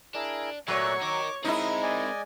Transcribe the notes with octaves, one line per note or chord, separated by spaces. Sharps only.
D4 E4 G#4 A#4
A#2 F#3 A3 C#5 D5 E5 C#6 F#6
D#4 A#4 D6
G#3 C4 D#4 E4 A#4 D#6
D5 D#5 G#5